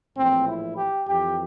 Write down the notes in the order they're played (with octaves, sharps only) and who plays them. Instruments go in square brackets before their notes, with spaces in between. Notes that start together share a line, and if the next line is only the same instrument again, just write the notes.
[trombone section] A#1 A2 E3 C4
E4
G4
F2 E3 G4